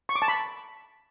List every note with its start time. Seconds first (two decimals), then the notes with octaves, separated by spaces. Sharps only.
0.09 C#6
0.15 D6
0.22 A5
0.28 B5